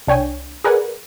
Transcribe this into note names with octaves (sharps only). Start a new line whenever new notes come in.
C2 D4 C#5 G5 G#5
G#4 A#4 B4 D5 F#5 G#5